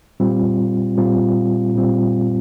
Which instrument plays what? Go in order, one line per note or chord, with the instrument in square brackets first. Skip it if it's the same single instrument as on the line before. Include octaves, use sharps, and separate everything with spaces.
[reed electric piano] A#2 G3 C4 F4
A#2 G3 C4 F4
A#2 G3 C4 F4